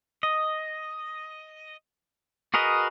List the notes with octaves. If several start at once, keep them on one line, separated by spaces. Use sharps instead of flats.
D#5
F#4 G#4 A#4 B4 D#5